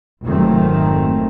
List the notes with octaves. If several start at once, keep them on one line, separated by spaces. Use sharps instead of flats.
F1 G#2 D#3 F#3 A3 C4